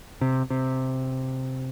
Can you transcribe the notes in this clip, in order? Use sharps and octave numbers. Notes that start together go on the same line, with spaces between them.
C3
C3